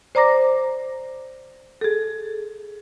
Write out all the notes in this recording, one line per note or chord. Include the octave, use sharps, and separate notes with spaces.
C5 D5 A#5 D6 A#6
G#4 A4